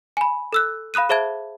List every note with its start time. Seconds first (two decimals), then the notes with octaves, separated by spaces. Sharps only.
0.17 G#5 B5
0.53 A4 E6 F#6
0.94 F5 B5 D#6 F#6 D#7
1.09 G#4 C5 E5 A5 G#6